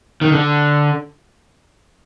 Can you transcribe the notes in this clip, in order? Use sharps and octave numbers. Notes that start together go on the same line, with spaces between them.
D#3
D3